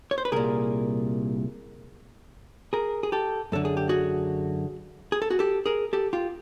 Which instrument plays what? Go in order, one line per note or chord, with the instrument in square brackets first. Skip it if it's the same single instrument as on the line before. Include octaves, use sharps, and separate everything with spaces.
[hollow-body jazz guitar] C#5
C5
B4
C2 A#2 G#4 A#4
G#4 A#4
G#4
G4 A4
F#2 D3 A4
G#4
G4
F#4 G#4
G#4
A4
F#4 G#4
G4 A4
G#4 A#4
G4 A4
F4 G4